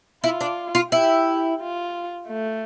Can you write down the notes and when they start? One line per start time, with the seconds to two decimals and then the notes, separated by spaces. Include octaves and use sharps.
0.24 E4 F4
0.41 D4
0.75 F4
0.92 E4 G4
1.60 F4
2.28 A3